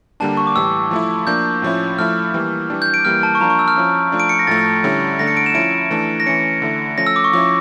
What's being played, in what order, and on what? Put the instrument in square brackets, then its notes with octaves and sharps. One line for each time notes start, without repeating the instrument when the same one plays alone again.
[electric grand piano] D3 G3 A#3 D4 [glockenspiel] A5
[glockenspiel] C#6
D6
[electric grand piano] A2 E3 G3 [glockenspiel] E6
[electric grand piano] F3 A3 E4
[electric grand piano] F3 A#3 D4 [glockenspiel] G6
[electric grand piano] A2 F3 C#4 E4
[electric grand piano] F3 A3 E4 [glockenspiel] F6
[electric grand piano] E3 G3 A#3
E3 G3 D4
[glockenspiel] G6
D7
[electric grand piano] E3 G3 A#3 [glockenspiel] F6
[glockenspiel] A5
C#6
[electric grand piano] F3 A#3 D4 [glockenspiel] A#5
[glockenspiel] C#6
E6
F6
[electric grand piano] F3 C#4 E4
F3 A3 D4
[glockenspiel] D7
C#7
A#6
[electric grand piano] A2 F3 A3 [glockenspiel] A6
[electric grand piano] D3 G3 C#4 E4
[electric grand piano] D3 A3 D4 [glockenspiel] A#6
[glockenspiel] C#7
D7
E7
[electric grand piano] F3 C#4 E4 [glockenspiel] D7
[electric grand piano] E3 A3 D4
[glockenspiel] A#6
[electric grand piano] E3 A3 C#4 [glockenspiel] C#7
[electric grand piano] D3 A3 E4
[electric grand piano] F3 A3 C#4 [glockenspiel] A#6
[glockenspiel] E6
D6
C#6
[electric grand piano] F3 C#4 E4 [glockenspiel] D6